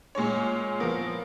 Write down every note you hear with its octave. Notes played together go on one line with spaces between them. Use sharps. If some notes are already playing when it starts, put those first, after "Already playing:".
A#2 G#3 C#4 C#5
F3 B3 A#4